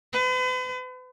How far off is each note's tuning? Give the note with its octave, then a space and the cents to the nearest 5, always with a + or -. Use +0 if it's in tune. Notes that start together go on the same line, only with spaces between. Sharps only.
B4 +45